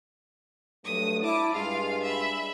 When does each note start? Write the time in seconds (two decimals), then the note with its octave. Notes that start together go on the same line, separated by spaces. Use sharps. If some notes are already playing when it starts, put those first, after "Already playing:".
0.85 G2 F#3 A3 D#6
1.22 E4 A5 D6
1.53 G2 G#3 F4 F5
2.03 E5 B5